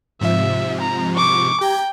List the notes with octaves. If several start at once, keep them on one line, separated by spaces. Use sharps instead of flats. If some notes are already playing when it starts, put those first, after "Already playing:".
G#2 C3 F3 E5
A#5
C#6 D6
G4 G5 A#5 G#6